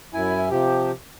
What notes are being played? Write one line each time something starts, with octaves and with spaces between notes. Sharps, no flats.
F#2 E4 G#5
C3 F3 G4